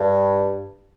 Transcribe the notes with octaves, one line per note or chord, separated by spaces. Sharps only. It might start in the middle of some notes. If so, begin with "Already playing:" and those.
Already playing: G2